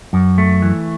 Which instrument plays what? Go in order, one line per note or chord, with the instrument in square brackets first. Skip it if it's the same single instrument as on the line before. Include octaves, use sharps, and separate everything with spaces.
[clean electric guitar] F#2
A3
E3